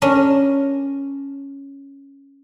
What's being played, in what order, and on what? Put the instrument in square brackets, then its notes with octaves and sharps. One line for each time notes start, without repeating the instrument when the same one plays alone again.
[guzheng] C#4 D4 A#4